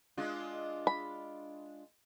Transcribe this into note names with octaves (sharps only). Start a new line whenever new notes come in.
G#3 D4 F4
B5